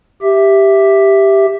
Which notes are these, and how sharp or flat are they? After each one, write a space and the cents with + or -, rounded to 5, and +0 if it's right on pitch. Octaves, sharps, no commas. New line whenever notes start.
G4 +0 E5 +0